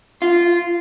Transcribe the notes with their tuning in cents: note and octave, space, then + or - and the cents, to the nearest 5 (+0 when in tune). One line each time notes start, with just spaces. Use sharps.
F4 -10